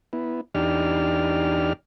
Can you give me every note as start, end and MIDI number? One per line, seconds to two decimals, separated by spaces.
0.13 0.41 59
0.13 0.41 64
0.55 1.73 40
0.55 1.73 62
0.55 1.73 63
0.55 1.73 67
0.55 1.73 74
0.55 1.73 89